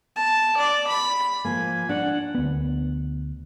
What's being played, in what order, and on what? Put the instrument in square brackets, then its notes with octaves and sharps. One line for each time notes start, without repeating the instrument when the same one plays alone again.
[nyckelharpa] A5
D5
B5
[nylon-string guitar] F3 A#3 [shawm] G#5
[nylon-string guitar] D4 [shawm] F#5
[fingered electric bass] D2 B3